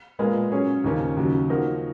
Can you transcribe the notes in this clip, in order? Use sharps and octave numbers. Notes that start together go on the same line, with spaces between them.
A#2 G#3 B3 F4 A#4
F#3 C#4 G#4 C#5
D#2 C#3 F3 A#3 C#4
D#2 C#3 F#3
F3 A#3 D#4 F#4 A#4